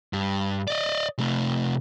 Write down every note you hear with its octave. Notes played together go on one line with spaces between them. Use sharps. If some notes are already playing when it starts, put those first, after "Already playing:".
G2
D5 D#5
C3 A3